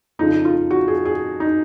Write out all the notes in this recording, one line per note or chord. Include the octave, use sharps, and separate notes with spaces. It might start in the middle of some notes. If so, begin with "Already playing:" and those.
F2 C#3 F3 D#4
F4
F#4
G#4
G#4
D#4